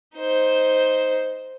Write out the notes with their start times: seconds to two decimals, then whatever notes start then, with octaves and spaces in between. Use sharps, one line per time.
0.17 D#4 C5